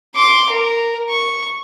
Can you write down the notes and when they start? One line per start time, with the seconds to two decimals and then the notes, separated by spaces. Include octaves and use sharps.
0.15 C6 D6
0.49 A#4
1.10 C#6